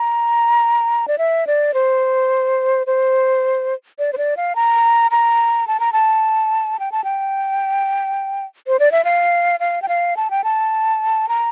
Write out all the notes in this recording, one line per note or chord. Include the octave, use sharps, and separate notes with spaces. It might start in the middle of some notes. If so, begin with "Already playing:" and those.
Already playing: A#5
D5
E5
D5
C5
C5
D5
C5
D5
F5
A#5
A#5
A5
A#5
A5
G5
A5
G5
C5
D5
E5
F5
F5
G5
F5
A5
G5
A5
A#5